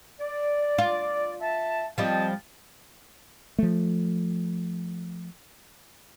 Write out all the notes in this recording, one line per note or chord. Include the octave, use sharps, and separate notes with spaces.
D5
F4
E5 A5
F3 G3 C4 D#5 A5
F3 A3